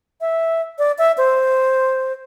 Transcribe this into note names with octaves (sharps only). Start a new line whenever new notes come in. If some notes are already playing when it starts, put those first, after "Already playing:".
E5
D5
E5
C5